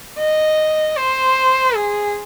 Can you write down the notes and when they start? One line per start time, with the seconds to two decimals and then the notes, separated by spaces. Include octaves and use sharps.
0.19 D#5
0.97 C5
1.75 G#4